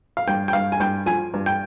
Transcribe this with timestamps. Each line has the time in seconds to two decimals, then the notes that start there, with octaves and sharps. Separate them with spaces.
0.17 F5
0.28 G2 G5
0.48 G5
0.53 G2 F5
0.72 G#5
0.80 G2 G5
1.06 F3 G#5
1.34 G2
1.46 G5